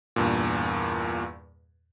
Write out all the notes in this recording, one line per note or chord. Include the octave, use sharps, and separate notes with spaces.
E2 G2 A#2